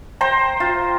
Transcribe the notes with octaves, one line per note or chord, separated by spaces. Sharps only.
C5 G5 A#5
F4